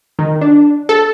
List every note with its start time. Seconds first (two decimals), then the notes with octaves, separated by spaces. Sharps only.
0.19 D#3
0.41 D4
0.89 A4